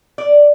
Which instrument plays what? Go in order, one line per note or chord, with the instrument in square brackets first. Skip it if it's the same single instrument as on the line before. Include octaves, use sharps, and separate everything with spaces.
[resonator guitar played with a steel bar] D5